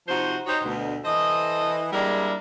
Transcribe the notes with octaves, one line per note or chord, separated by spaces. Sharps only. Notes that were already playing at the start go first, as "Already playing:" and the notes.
C3 F3 D#4 F#4 C5
D#4 F#4 G4 C5 C#5 D#5
D2 B2
E3 A4 C5 D#5
G3 G#3 A#3 D4 E4 A#4